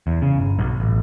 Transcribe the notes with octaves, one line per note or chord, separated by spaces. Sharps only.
E2
C#3
G1
B1
A1